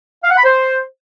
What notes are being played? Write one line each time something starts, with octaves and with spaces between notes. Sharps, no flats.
F5
F#5
B5
C5